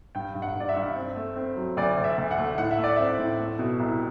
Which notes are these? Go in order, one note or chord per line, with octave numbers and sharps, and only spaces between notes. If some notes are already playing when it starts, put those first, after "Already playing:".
G2 G5
G2
F#5
G2 D5
E5
G2
C4
A3
C4
F#3
D2 D5
D2
E5
D2
F#5
A3
A2 F#5
E5
A3
D5
C4 E5
A2
A3
B2
C2